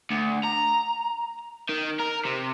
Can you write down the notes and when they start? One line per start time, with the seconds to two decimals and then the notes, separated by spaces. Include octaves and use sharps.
0.11 D2
0.45 A#5
1.69 D#3
2.00 A#4
2.26 C3